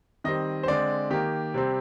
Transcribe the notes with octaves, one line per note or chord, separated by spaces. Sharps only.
D#3 G3 C4 D#5
C5
D3 G#3 C4 D5
D#3 A#3 G4
C3 G3 C4